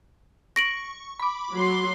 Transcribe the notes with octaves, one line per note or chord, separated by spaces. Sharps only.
C#6 A#6 D7 F#7
B5 D6
F#3 C6